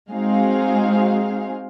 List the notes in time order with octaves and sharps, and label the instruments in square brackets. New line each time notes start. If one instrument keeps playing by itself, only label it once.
[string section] G#3 C4 D#4 F#4 G#4 F5